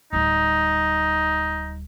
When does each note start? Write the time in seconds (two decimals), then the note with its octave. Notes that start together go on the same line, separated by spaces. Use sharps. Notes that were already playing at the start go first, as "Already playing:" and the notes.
0.13 D1 G3 D#4